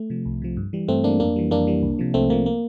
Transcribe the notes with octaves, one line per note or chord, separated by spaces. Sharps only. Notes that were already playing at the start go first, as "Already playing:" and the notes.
Already playing: A3
C3 F3
C2
C3 F3
G2
E3 G3
G2 A3 C4
E3 G3 A#3 D4
F2 A#3 D4
E3 G3
F2 A#3 D4
E3 G3
C2
C3 F3
C2 A3 C4
C3 F3 A#3
A#3